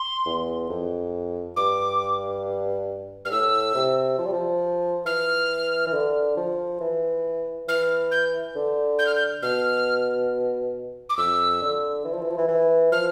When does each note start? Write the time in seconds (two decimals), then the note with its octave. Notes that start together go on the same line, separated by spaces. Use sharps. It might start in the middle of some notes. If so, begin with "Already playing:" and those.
Already playing: C6
0.25 E2
0.69 F2
1.56 G2 D6
3.25 G2 F6
3.31 A2 E6
3.75 C3
4.18 F3
4.26 G3
4.33 F3
5.05 E3 F6
5.86 E3
5.93 D3
6.37 F3
6.81 E3
7.68 E3 F6
8.11 G6
8.56 D3
8.99 G6
9.06 F6
9.15 G6
9.42 B2 F6
11.09 D6
11.17 F2 E6
11.61 D3
12.05 E3
12.13 F3
12.21 E3
12.30 F3
12.38 E3
12.48 E3
12.92 F3 F6